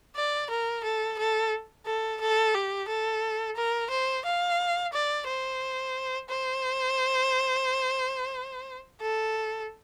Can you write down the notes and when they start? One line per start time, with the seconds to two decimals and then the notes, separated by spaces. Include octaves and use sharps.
0.16 D5
0.50 A#4
0.84 A4
1.19 A4
1.86 A4
2.21 A4
2.55 G4
2.89 A4
3.56 A#4
3.91 C5
4.25 F5
4.93 D5
5.27 C5
6.29 C5
9.01 A4